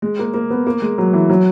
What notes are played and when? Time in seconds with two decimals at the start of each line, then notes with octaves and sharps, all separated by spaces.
0.02 G#3
0.19 A#3
0.34 A#3
0.50 B3
0.67 A#3
0.82 G#3
0.98 F#3
1.13 E3
1.29 F#3